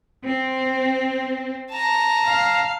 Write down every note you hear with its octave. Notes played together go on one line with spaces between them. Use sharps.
C4
A5 A#5
F5